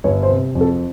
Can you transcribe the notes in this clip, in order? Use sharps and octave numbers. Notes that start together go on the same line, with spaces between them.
G1 C#5
C5
C3
F2
A4